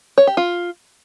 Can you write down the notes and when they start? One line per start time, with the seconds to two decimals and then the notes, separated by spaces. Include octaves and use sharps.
0.18 C#5
0.27 G4
0.37 F4